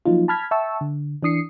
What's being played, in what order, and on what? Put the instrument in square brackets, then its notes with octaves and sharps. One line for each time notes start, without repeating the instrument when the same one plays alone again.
[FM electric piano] F3 F#3 A#3 D#4 F4
A5 B5 F6 G#6 B6
E5 G5 A5 C#6 E6
D3
E3 D4 D#6 C7 C#7